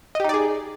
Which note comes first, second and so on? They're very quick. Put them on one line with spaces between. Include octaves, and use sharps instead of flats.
D#5 G4 D#4 D5 G#4